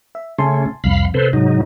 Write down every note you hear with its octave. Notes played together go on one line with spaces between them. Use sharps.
E5
C#3 A3 C#4 G#5 A5 C6
C2 F2 F5 B5
C3 A4 B4 C5
G#2 F#3 D#4